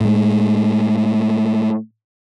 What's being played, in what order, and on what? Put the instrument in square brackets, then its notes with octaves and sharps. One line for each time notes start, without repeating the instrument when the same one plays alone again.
[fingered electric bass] A2 G#3